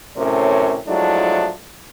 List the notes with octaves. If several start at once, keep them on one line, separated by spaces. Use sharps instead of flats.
F#2 A2 C3 C#4 A#4 C#5
F3 F#3 G#3 A3 D4 E4